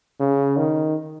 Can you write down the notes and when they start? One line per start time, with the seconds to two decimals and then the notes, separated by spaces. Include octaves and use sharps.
0.20 C#3
0.57 D#3